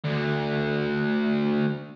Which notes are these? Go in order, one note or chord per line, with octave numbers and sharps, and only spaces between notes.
D2 D3